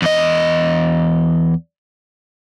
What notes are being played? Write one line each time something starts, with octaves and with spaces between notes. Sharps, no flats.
E2 D#5